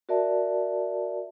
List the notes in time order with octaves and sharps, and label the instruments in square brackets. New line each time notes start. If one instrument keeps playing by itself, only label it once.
[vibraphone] F#4 A#4 D5 E5 A5